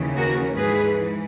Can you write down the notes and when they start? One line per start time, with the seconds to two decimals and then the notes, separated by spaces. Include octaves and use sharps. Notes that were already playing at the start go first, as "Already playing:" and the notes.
Already playing: D#2 C#3 E3
0.16 F#4 A#4
0.56 G#2 E3 G#4 B4